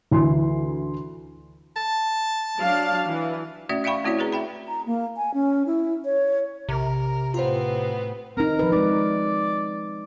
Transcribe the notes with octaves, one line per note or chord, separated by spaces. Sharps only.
D2 E3 C6
A5
F#3 D4 F5
E3
A3 C#4 F#4 D5 E5
D5 E5 F5 G5 B5 C#6
A3 C4 E4 F#4 C#5 D5
F#4 G#4 B4 A#5
E5 G5 B5
A#5
A#3
G#5
C#4
E4
C#5
A#1 C3 A#4
A2 B3 C4 F4 C5
C4 D#4 A#4
F3 B4
G#3 D#4 D5